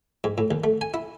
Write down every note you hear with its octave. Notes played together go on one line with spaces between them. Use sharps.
G#2
A2
D#2
A3
G#5
E4